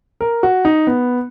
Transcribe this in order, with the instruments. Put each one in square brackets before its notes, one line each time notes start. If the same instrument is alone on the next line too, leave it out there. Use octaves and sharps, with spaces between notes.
[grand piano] A#4
F#4
D#4
B3